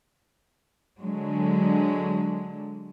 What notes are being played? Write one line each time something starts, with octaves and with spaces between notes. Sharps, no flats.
D3 F#3 G#3